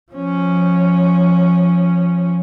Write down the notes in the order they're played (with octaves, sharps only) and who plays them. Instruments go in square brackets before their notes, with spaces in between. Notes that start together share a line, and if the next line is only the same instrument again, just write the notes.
[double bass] F3 C#4